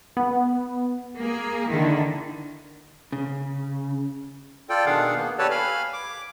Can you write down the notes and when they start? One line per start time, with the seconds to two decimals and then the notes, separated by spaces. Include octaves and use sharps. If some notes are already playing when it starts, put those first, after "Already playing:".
0.17 B3
1.19 A#3 G#4
1.70 D3 D#3 E4
3.12 C#3
4.70 F4 A4 D5 G5
4.86 B2 D#3 D4 G#4 F5 F#5
5.16 A#3 B3
5.38 G4 A4 B4 C#5 D5 A5
5.51 F5 G#5 B5 F6
5.93 D6